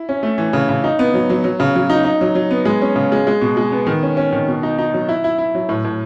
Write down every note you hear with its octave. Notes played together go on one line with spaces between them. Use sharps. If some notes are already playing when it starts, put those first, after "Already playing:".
Already playing: E4
C#4
A3
E3
C#3
C#3
D#4
B3
F#3
F#3
F#3
C#3
F#3
D#4
D#4
F#3
F#3
B3
G#3
C#4
C#3
G#3
G#3
B2
G#3
B3
D#3
C#4
C#4
D#3
B2
D#4
D#4
F#3
E4
E4
E4
F#3
A2
A2